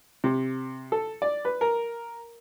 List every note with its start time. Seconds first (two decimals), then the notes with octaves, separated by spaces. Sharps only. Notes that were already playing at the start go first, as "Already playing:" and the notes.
0.24 C3
0.92 A4
1.22 D5
1.45 B4
1.61 A#4